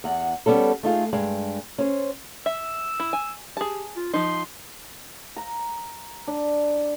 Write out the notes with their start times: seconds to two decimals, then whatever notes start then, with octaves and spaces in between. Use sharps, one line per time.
0.04 E2 F#5
0.46 G3 B3 C#4 A4
0.83 A3 D#4 F4 G#4
1.13 G2 G#3 G5
1.78 C#4 C5
2.46 E5 E6
3.00 E4
3.13 G#5
3.57 G4 G#4 A5
3.97 F4
4.13 F3 D#4 C6
5.36 A#5
6.27 D4